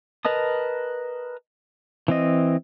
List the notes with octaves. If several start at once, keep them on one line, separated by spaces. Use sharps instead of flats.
A#4 B4 D#5 A5 D#6
E3 C4 D#5